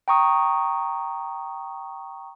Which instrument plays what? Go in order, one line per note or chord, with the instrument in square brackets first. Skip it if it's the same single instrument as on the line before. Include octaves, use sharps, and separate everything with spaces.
[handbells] G5 A#5 C#6 D#6